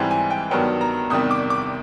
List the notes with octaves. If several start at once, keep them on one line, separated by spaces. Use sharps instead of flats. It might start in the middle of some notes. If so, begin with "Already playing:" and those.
Already playing: G#2 E3 G3 C4 G#5
G#5
G5
G2 D#3 F#3 B3 G5
A#5
E2 C3 D#3 G3 D#6
D6
D6